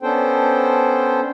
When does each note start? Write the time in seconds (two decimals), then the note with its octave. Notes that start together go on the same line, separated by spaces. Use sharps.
0.02 B3 C#4 D4 A4 C5 G5